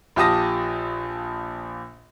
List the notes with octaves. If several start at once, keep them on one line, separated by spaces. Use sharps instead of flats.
A#1 F4 G4 A5 D#6 A#6